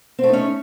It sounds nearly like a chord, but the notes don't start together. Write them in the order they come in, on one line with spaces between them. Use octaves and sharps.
C4 A3 D#4 C#4